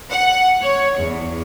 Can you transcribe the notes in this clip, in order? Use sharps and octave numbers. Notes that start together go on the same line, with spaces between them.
F#5
C#5
E2